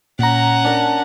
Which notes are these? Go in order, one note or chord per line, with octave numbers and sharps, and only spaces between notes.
A#2 C#4 F#5 A#5
D4 A#4